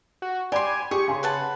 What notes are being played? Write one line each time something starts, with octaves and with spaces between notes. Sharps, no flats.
F#4
G4 D5 G#5 B5 C6 D6
G4 G#4 C#6
C#3 G#5 C6
B4 F#5 A5